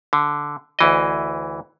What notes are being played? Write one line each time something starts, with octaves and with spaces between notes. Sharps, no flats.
D3
D2 E3 D#5